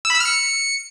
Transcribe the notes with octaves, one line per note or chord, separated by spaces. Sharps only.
E6
B5
E6
F6
C#7